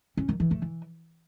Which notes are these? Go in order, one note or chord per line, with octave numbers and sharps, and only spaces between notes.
C#4
D#3
E3
A3
E3